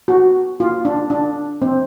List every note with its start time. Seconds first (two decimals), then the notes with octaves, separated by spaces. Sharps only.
0.08 F#4
0.60 F4
0.85 D4
1.10 D4
1.62 C4